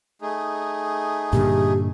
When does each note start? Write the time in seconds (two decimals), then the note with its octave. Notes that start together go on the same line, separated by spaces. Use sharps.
0.22 A3 D#4 G#4
1.33 G2 A#2 D3 G4